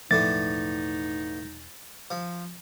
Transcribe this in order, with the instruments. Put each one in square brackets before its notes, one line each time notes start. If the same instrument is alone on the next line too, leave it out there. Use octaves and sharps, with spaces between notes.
[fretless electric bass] E1 F3 A3 [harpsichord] A2 D3 E3 [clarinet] D#4 [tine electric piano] A6
[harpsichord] F3